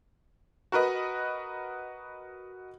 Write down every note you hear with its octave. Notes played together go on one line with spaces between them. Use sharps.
F#4 A#4 B4 D#5